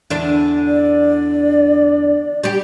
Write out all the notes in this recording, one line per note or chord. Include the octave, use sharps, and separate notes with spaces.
E2 D3 D4
D5
G3 G4